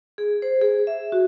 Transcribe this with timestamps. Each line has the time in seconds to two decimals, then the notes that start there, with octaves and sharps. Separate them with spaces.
0.18 G#4
0.42 C5
0.61 G#4
0.87 E5
1.12 F#4